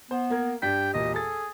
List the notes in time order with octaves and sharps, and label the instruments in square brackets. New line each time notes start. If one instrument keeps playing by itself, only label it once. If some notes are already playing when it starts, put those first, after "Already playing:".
[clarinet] B3 [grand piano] C5
[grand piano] A#3 A#4 G#6
[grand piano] G2 D5 B6 [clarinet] G4 [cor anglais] G5
[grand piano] E1 A#2 A#3 [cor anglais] D#5
[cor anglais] G#4 [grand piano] A4 A6